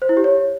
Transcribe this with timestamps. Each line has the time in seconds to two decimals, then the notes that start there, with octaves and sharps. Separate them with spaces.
0.02 C5
0.09 E4
0.17 G4
0.24 C#5